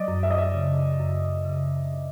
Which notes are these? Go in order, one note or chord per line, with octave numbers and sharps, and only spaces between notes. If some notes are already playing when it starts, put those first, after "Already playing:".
Already playing: F#3 D5 D#5
F#2
E5
D#5
E5
C#3
F#2
C#3